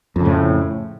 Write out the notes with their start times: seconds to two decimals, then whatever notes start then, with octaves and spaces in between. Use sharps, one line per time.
0.16 F2
0.21 C#3
0.25 A2